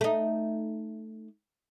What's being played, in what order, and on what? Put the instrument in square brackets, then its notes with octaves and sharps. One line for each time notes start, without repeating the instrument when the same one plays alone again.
[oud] A3 D#4